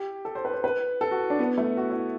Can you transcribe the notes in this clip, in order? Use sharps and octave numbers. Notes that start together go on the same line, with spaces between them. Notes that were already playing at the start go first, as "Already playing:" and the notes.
Already playing: G4
A4
C5
B4
C5
B4
A4
F#4
D4
B3
A3
F#4
E4